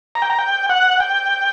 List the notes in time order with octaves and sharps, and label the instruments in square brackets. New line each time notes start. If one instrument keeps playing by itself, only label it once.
[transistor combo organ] A#5
G5
A#5
G5
F#5
G5